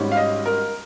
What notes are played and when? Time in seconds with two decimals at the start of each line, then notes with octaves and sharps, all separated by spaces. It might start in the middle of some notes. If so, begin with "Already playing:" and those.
Already playing: G#1 G#2 G3 C#4
0.12 F5
0.17 D#5
0.46 A#4